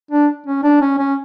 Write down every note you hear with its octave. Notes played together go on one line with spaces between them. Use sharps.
D4
C#4
D4
C#4
C#4